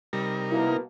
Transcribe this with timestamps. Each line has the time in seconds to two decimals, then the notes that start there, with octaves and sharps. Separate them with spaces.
0.13 C3 G3 D#4 A#4
0.50 B2 A#3 E4